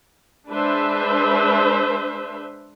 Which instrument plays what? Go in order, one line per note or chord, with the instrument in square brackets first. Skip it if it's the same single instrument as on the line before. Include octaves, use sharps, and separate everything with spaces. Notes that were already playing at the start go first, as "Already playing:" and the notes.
[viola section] G#3 D4 B4 C5 E5